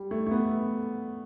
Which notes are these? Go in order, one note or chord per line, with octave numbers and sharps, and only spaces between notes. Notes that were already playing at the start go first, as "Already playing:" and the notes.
Already playing: G3
A3
A3
B3